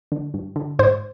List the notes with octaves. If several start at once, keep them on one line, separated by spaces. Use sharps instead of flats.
D3
G2
D3
G#2 C5